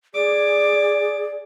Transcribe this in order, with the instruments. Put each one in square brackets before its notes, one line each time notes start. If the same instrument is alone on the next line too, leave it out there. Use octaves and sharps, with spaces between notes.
[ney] G#4 [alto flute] D5 [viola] D6